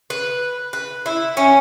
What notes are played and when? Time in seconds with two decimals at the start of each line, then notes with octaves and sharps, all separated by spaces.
0.10 B4
0.73 B4
1.06 E4
1.37 C#4